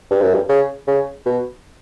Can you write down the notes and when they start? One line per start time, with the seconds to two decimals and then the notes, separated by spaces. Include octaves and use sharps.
0.11 G2
0.22 F#2
0.34 G2
0.49 C#3
0.88 C#3
1.26 B2